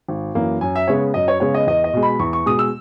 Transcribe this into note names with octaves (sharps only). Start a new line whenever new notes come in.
G#1
F#2 E3 A#3
F#2 G#5
E5
C#3 G#3 B3 C#5
F#2 D#5
C#5
C#3 G#3 B3 C#5
D#5
E2 D#5
D#5
B2 G#3
B5
E2 C#6
C#6
B2 G#3 D#6
E6